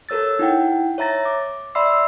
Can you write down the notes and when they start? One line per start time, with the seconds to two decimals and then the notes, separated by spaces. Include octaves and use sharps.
0.09 A4 A#4 C#5 E6 A6
0.39 D#4 E4 F#5 G5
0.98 C#5 E5 A#5 A6 A#6
1.25 D6
1.75 D5 E5 B5 C6 E6 C7